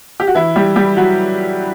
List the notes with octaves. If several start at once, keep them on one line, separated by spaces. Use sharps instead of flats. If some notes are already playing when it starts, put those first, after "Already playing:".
G4
F#4
E3 E4
G3 G4
G3 G4
F#3 F#4